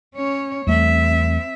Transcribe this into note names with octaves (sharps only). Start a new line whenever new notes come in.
C#4 C#5
E2 G3 A3 C4 E5